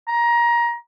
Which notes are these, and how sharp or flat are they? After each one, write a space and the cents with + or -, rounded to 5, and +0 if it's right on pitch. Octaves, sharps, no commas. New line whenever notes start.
A#5 +20